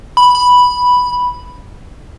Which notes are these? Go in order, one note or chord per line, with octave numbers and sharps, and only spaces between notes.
B5
B5